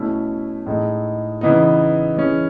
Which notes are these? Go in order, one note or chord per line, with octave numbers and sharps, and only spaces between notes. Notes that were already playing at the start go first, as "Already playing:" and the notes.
Already playing: B2 A3 C#4 E4
A2 G#3 D#4
C#3 E3 B3 D#4
E3 G#3 C#4